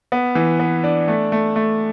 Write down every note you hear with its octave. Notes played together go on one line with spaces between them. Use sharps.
B3
E3
B3
D4
A3
A3
A3